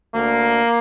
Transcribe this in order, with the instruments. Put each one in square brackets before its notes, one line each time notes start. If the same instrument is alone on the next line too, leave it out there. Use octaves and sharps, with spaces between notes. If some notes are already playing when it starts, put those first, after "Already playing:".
[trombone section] D2 D3 A#3